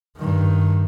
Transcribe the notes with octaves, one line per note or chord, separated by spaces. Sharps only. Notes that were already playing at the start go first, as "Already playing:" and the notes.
G2 D#3